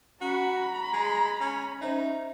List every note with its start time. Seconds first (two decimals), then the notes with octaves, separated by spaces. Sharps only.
0.21 C#4 F#4 A#5 B5
0.93 G#3
1.41 C#4
1.81 C#4 D#4 C5 E5